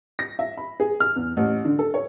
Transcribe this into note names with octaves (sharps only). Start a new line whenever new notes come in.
A#6
E5
B5
G#4
F6
E2
A1
D3
A4
C#5